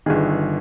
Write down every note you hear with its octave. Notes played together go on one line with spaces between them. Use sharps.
G1 G2 D#3 G#4